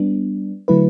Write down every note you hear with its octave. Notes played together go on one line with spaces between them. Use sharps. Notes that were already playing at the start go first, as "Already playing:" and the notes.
Already playing: G3 B3 D4
D3 F#3 A3 E4 B4